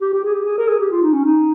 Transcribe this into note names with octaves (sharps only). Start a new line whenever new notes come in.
G4
G4
G#4
G4
G#4
A#4
G#4
G4
F4
D#4
C#4
D#4